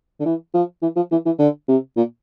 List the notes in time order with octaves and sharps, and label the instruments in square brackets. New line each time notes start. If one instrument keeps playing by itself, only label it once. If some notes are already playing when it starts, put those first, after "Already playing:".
[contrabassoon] D3
E3
F3
E3
F3
E3
E3
D3
C3
A#2